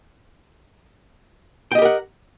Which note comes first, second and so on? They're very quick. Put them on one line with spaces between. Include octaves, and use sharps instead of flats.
G5 D#5 G4 A#4 F#5